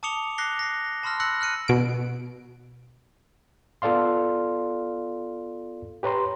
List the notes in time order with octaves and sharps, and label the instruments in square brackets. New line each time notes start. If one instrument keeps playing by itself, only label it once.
[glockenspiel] A5 D6 D#6 C#7 F7 G7
D6 F#6 A#6 C7 G7
A#6 C7
A5 B5 C6 E6 F6 A#6
E6 F#6 A#6 C#7 F#7
F6 F#6 C#7 D#7
[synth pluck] B2 D7
[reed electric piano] B3 F4 A4 D5 F5 C6
G4 B4 C#5 A#5 C6